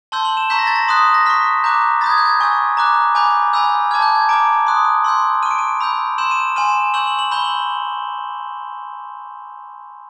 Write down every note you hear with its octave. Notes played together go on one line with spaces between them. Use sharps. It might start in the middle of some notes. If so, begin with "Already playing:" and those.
A5 C6 E6 G6 G7
F#7
E7
A#5 C#6 E6 G6 B6
A#6
A6
A#6
C6 D#6 F#6
A#6
C#6 F6 B6
A#5 D6 F#6 G6
B5 D#6 G6 A6
G#6
G6
G#6
G#5 C#6 E6 G6
A#5 D6 F#6
G#5 B5 D6 G6
G#5 B5 E6 G6
A5 D6 F6 G#6
G6
G#6
A#5 D6 F6 D7
C6 D#6 F#6
C6 E6 G6
C#6 F6 D#7
D7
D#7
B5 E6 G6
C6 E6 G6 E7
D#7
G#5 C6 F6 D#7
E7
C#6 E6 G6 F#7
F#7
F#7
B5 E6 G6 G7
F#7